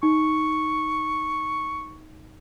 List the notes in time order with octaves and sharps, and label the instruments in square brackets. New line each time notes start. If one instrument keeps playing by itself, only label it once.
[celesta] D#4 [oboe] C#6